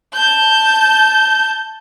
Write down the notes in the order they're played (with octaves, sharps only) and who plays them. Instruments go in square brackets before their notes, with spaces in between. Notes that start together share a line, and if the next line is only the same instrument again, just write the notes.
[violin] A5 G6